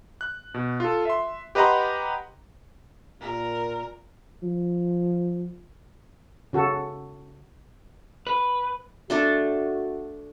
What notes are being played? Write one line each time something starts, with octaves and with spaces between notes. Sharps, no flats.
F#6
B2
F4 A4
E5 C6
G4 B4 D#5 F#5 A#5 C6
A#2 A#4
F3
C#3 F#4 A4
B4
A3 D4 F#4 A4